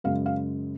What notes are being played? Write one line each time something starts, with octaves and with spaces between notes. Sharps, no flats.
F#2 C#3 G#3 F5
F5